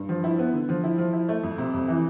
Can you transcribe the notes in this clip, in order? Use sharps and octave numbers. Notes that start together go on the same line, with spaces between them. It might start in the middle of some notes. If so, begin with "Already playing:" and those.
Already playing: G2
F3
E4
B3
D3
F3
E4
F3
E4
A3
F2
C3
F2
E3